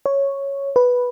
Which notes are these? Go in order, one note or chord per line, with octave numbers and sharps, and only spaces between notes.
C#5
B4